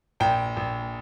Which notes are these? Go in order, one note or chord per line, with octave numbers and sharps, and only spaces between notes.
A#1 G5
A#1